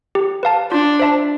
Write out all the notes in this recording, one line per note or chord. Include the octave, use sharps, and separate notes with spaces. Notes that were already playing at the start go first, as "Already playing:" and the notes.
G4
B4 F5 A5
D4 F4
C5 E5 A5